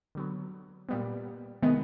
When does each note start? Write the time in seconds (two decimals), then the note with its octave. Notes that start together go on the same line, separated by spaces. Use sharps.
0.15 D3 F#3 B3
0.89 A#2 G3 B3
1.62 C3 D#3 G#3 B3